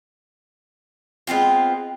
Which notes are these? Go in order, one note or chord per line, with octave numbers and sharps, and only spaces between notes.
G#3 B3 C4 F4